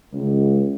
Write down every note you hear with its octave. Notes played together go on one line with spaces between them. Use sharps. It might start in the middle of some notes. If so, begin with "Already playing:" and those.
C#2